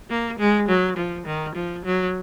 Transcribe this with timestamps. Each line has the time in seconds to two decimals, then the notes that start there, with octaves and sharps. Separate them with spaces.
0.10 A#3
0.39 G#3
0.69 F#3
0.97 F3
1.26 D#3
1.56 F3
1.85 F#3